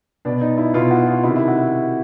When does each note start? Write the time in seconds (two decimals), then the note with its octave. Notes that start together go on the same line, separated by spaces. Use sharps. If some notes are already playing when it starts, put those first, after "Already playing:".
0.25 B2 D4
0.41 D#4
0.58 E4
0.74 B2 F4
0.90 F#4
1.07 F4
1.23 C3 D#3 E4
1.36 E4
1.48 F#4